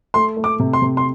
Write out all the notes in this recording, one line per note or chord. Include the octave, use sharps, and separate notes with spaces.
A3 C6
A3
D6
C3
C6
C3
C6